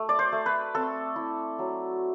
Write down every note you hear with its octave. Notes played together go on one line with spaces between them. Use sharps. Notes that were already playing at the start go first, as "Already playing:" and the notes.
Already playing: A3
D5
C5
A3
B4
C4 A4
E4
F#3